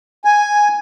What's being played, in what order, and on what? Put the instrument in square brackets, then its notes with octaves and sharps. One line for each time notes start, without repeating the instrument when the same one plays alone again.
[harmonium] G#5